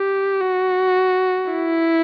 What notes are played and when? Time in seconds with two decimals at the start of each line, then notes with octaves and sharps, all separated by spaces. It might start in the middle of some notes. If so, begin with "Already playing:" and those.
Already playing: G4
0.41 F#4
1.51 E4